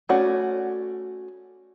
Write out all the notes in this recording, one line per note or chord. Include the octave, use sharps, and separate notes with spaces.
A3 C#4 F#4 D5